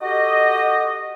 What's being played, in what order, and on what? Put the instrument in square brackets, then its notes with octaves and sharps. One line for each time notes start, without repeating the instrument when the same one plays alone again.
[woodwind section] F#4 G4 A4 D#5